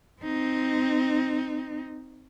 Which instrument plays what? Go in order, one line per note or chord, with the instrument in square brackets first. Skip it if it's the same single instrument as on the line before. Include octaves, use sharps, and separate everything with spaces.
[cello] C4 D#4